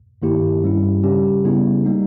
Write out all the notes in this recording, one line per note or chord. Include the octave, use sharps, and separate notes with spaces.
G2 D#3 A#3 E4 G4
G2 G3 C#4 E4
C#3 G3 C#4 G4
C#3 G3 B3 E4
G3 A#3 D#4